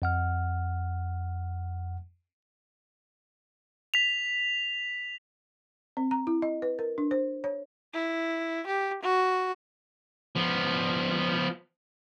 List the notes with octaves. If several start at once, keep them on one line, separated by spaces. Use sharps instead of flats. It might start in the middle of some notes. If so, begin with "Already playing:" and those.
F2 F#5 F6
B6 F7
C4
A#5
E4
D#5
B4
A#4
D4
C5
C#5
E4
G4
F#4
F3 B3